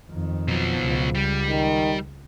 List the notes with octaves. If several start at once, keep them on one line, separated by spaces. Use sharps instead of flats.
F2 D#3
B2 F3 F#3
C#2
G3
D#3